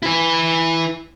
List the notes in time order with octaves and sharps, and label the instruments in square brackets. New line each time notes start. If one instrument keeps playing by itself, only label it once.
[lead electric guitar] E4 B4